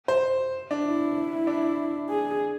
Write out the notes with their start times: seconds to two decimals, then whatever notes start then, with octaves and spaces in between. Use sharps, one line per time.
0.08 C5
0.71 D4
0.86 E4
1.47 D4
2.09 G#4